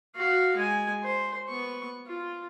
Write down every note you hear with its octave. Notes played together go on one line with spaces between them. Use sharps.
F#4 F5
G#3 G#5
C5
B3 C#6
F4